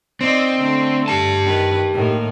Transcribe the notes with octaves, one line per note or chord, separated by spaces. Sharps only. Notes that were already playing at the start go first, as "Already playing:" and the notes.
C4 D#4 D5 D#5
D3 A3
G4 A5
D#3 B4
A2 D#3 A#3